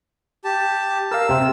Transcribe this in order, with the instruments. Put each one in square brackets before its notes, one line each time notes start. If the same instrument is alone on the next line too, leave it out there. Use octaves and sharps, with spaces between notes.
[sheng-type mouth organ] G4 A5
[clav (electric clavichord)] A#4 F5 [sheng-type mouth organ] E6
[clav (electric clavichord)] C3 C4